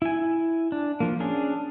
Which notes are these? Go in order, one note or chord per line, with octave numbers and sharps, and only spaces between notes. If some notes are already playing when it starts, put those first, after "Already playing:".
E4 G#5
D4
F3 A#3
C#4 D4 G#4